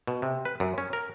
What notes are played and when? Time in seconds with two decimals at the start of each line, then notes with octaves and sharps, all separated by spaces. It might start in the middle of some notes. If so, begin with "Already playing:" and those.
0.07 B2
0.22 C3
0.45 B4
0.60 F#2
0.78 C#4
0.93 A#4